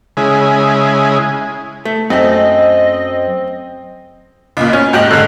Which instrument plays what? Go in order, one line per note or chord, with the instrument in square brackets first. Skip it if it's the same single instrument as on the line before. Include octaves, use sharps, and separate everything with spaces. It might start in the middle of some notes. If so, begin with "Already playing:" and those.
[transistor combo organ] C#3 G#3 E4 G#5
[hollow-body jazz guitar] A3
[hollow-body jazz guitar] F#2 A3 [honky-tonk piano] C4 [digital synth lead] D#5
[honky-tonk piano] C#2 A#2
C#4
G#2 G4 D#5 F#7
G#2 D3